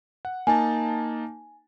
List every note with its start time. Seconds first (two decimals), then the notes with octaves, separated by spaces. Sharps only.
0.25 F#5
0.47 A#3 D#4 G#5 A5